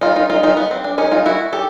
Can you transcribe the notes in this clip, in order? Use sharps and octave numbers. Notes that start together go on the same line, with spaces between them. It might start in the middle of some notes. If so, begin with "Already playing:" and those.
D#4 F4
D#4 F4
D#4 F4
D#4 F4
B3
C4
D4
C#4 D#4
D#4 F4
E4 F#4
G4 A4